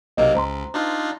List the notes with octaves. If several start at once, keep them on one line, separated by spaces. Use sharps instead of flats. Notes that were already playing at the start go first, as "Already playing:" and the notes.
B1 C3 A#3 D#5
C#2 C5 A#5 C6
D4 D#4 F4